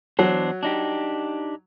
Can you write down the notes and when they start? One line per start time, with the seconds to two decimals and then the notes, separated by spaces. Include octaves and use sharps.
0.19 E2 F#3 D4 C5
0.63 D4 D#4 G4